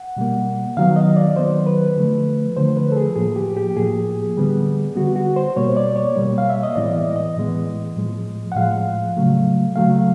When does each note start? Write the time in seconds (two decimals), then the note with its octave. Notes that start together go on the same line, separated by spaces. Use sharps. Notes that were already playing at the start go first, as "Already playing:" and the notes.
Already playing: F#5
0.17 B2 G3 A#3
0.77 D#3 F#3 B3 F5
0.96 D#5
1.16 D5
1.36 D#3 F#3 B3 C5
1.67 B4
1.96 D3 F3 A3
2.57 D3 F3 A3 C5
2.77 B4
2.92 A4
2.96 G#4
3.16 A2 F3 A#3 G#4
3.36 G4
3.57 G4
3.77 A2 F3 A#3 G#4
4.37 D3 G3 B3
4.96 D3 G3 B3 F#4
5.16 F#4
5.36 C5
5.56 B2 G3 A#3 C#5
5.77 D5
5.96 C#5
6.16 B2 G3 A#3
6.38 F5
6.50 E5
6.63 D#5
6.76 A2 E3 G#3 B3 D5
6.96 D#5
7.16 D#5
7.36 A2 E3 G#3 B3
7.96 A2 F3 G#3
8.52 F#5
8.56 A2 F3 G#3 F5
9.17 C#3 F#3 A3
9.76 C#3 F#3 A3 F5